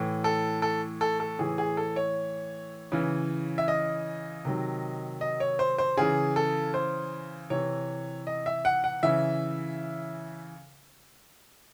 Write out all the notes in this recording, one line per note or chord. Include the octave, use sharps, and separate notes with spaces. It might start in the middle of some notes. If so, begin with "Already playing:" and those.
Already playing: A2 E3
A4
A4
A4
A4
A2 E3 G#4
G#4
A4
C#5
C#3 E3
E5
D#5
C3 D#3 F#3
D#5
C#5
C5
C5
C#3 E3 G#4
A4
C5
C3 E3 C#5
D#5
E5
F#5
F#5
C#3 E3 E5